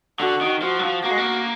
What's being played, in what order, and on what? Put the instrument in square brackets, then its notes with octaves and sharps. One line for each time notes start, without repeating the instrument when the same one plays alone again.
[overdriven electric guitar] D3 [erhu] F#4
[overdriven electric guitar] D#3
[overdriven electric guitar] F3 [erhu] F#4
[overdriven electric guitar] F#3
F3
[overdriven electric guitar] A#3 [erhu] F#4
[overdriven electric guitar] G#3
A#3